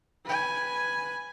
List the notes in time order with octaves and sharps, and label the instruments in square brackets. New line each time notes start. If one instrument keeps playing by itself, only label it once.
[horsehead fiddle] B4 G#5